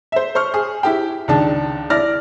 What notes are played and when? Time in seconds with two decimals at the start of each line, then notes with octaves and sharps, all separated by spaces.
0.12 C5 E5
0.35 C5 C#6 F6
0.54 G#4
0.83 E4 G4 G5
1.28 C#2 D#3 D4 A5
1.90 E4 D5 F6 A#6